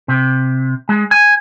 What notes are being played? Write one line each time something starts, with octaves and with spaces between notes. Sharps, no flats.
C3
G#3
G#5